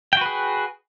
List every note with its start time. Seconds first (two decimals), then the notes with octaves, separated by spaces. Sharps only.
0.13 G5
0.17 F#4
0.21 B4
0.26 G#4